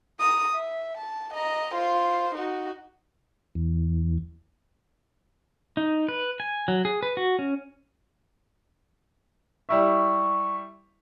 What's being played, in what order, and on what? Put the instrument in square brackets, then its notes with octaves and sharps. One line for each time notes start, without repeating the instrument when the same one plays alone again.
[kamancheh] A#5 D#6
E5
A5
D#5 A#5
F4 C5
D#4 F#4
[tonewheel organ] E2
[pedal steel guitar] D#4
B4
G#5
F#3
G#4
B4
F#4
C#4
[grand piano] G3 E4 E5 [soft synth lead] C#6